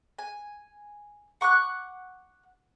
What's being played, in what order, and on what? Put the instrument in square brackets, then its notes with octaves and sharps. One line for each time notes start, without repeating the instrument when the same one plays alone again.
[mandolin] G#5
F#5 C#6 D6 F#6